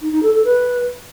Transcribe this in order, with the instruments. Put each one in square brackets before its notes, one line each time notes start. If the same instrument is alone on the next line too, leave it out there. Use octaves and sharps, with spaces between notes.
[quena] D#4
D#4
A4
A4
B4